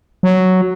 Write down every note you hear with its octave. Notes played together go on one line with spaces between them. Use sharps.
F#3